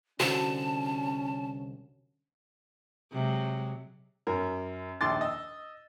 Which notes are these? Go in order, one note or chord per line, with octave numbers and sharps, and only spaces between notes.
C2 D3 C#4 F#4 A5
C3 F#3 G#3
F#2 A#4
A#1 D#2 C6 D6 A6
D#5 E6